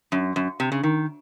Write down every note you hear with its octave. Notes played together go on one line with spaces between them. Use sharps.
F#2
F#2
C3
C#3
D#3